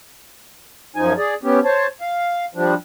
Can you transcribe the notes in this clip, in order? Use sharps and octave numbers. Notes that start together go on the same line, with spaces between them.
F#2 F3 D#4 G#5
G#4 D5
B3 C#4 G4
C5 C#5 A5
F5
F3 G3 D4